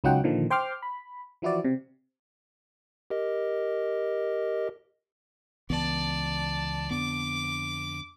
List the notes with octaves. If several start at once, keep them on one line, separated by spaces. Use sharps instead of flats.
C#2 F#3 D#4 F4 F#5 G5
A#2 D3 D#3 F3
C5 G5 C6 D6 F6
B5
E3 F3 E4 F#4 D5
C3
G4 A#4 D#5
C#2 E3 B3 D5 A5
F2 D3 B3 D6